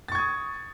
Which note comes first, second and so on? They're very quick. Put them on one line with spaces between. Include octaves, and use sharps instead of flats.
A6 C#6 G#6 D#6